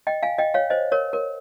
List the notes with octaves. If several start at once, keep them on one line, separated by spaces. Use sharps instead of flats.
D#5 G5
F5 G#5
D#5 G5
C#5 F5
C5 D#5
A#4 C#5
A#4